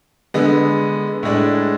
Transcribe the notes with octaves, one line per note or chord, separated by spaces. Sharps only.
D3 G#3 B3
A2 G#3 D4